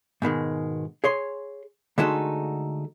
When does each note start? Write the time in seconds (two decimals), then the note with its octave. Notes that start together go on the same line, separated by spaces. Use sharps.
0.22 G#2 B2 D#3 G#3
1.04 G#4 C#5 C6
1.98 D3 G#3 A3 D#4 F#4 A4